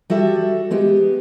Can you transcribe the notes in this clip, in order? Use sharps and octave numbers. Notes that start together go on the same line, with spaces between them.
G3 F#4 A4 E5
G#3 B3 G4